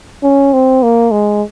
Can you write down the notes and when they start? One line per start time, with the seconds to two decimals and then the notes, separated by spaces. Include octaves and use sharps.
0.23 C#4
0.53 C4
0.83 A#3
1.11 G#3